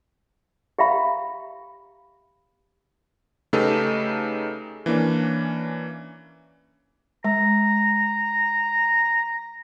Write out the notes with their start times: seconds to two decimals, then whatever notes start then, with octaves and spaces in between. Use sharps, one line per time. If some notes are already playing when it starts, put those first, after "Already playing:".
0.79 G4 E5 F5 B5
3.53 C#3 A3 D#4 G4 A4 B4
4.86 E3 A#3 C#4 D4
7.25 G#3 A#5